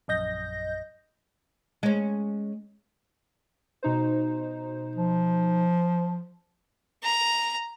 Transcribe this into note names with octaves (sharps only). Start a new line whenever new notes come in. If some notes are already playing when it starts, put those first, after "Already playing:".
A#1 F#2 D#5 G6 A#6
G#3 C#4
B2 D#4 C5
F3
A#5